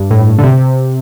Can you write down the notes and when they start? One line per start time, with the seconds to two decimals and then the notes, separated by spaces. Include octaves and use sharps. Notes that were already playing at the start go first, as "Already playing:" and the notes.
Already playing: G2
0.11 A2
0.39 D3
0.43 C3